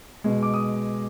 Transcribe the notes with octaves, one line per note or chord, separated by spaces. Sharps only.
B2 G#3
D6
D#6